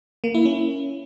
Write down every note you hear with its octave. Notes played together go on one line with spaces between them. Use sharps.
A#3
E4
C#4